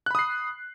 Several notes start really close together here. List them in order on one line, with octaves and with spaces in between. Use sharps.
F#6 B5 D#6 C7